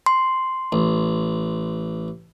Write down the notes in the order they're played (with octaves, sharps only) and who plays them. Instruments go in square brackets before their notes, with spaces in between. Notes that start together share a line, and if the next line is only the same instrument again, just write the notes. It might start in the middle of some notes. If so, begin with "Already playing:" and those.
[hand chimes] C6
[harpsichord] A1